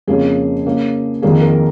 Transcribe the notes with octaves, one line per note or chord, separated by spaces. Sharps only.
F2 C#3 A#3 G#4
C#3 A#3
F2 D#3 A#3 G#4
A#4